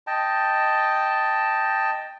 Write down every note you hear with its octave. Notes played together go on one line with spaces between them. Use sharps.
D#5 G5 A5